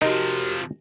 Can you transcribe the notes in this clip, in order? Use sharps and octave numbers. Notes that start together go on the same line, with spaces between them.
C3 F3 D#4 F#4 G4 A#4